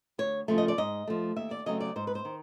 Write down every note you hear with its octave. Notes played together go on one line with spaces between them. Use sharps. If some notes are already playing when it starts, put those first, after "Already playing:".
D2 C#5
C#3 F3 A3
D#5
D5
G#2 D#5
F3 A3
D#2 E5
D5
C#3 F#3 A3 C4 D#5
D5
G#2 C5
B4
C5
D#3